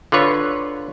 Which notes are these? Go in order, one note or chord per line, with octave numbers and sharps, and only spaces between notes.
D3 F4 B4 C#5